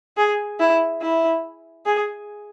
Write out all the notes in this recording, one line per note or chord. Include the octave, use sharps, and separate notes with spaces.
G#4
E4
E4
G#4